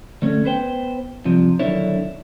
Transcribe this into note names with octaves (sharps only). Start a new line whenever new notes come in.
D3 A3 C#4
B3 B4 C5 G5
G2 C3 F3
B1 D3 D#3 D4 E4 C#5